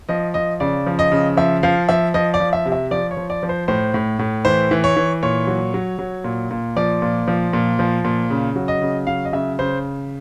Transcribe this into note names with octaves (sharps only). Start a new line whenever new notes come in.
F3 D#5
F3 D#5
C#3 D5
F3
D#5
C#3
F3 E5
F3 F5
F3 E5
F3 D#5
D5
F3
E5
C3
E5
F3 D5
C#5
F3
D5
F3
C5
A2 C5
A2
A2
E3 C5
E3
C#5
E3
A#2 C#5
F#3
F#3
F#3
A#2
A#2
F3 D5
A#2
F3
A#2
F3
A#2
C#3
F#3
D#5
C#3
F#3 F5
D#5
C#3 E5
C#3 C5